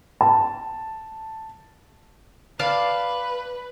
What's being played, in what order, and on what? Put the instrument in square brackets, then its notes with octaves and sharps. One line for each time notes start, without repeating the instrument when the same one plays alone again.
[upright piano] A5
[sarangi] B4 [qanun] D5 F5 A5